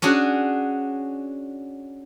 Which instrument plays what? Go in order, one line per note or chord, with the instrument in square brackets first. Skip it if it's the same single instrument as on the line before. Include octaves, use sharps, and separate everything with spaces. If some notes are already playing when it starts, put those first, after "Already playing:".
[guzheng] C#4 D4 F#4 G#4